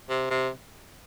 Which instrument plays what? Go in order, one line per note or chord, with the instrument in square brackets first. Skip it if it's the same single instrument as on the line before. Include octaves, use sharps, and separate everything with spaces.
[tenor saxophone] C3
C3